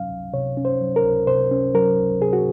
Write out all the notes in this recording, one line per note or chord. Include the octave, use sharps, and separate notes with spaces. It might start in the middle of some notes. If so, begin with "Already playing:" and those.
Already playing: C3 F#3 C#4 F5
C#2
C3 C#5
C#4
C5
F#3
A#4
C#2
C3 C5
C#4
F#3 A#4
C#2
C3 G#4
F#4